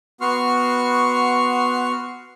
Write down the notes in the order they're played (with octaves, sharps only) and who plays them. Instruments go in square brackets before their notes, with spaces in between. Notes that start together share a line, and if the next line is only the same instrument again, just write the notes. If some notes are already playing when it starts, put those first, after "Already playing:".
[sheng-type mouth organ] B3 F#4 C6 C#6 F6